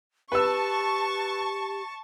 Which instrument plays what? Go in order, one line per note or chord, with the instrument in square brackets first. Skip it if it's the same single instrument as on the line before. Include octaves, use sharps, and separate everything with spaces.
[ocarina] G4 [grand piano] B4 E6 [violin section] A5 C#6